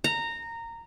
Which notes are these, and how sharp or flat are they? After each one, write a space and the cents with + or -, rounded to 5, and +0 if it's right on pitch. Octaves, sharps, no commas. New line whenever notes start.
A#5 -15